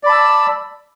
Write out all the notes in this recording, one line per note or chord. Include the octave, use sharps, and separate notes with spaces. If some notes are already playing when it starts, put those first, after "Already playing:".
D5 A5 B5 E6